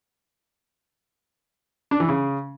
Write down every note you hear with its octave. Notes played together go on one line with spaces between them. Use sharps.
D4
E3
C#3